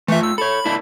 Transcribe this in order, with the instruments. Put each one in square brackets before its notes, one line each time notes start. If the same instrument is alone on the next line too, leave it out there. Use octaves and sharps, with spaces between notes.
[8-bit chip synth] E3 E5 [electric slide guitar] A3 F4
[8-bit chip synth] E6
[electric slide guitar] A4 C#5 [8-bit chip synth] B5
[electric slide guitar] A#3 D4 E4